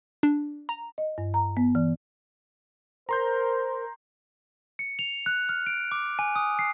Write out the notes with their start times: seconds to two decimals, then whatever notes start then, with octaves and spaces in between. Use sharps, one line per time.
0.23 D4
0.69 A#5
0.98 D#5
1.18 G2
1.34 A#5
1.57 B3
1.75 E3
3.09 A#4 C5 A#5 C6 G6
4.79 C#7
4.99 F7
5.26 F#6
5.49 F6
5.66 D7
5.92 D6
6.19 G#5
6.36 D#6
6.59 C7